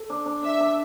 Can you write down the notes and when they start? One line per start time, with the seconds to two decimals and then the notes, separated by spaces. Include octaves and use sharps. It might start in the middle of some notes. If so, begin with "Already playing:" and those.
Already playing: A4
0.10 D4
0.26 D4
0.43 D4 E5
0.60 D4